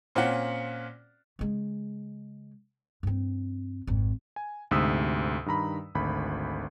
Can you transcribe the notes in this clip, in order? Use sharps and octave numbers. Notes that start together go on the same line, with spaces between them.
A#2 C4 C#4 F4 F#5
C#3 G#3
G2 C4
G#1 F2
G#5
D2 G#2 C3 D#6 E6 B6
G2 D#3 A#5 B5
G#1 D2 B5